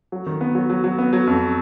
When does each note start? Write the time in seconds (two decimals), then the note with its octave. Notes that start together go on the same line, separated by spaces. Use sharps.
0.12 F#3
0.26 D#3
0.41 B3
0.55 F#3
0.70 F#3
0.84 F#3
0.98 B3
1.13 F#3
1.27 F2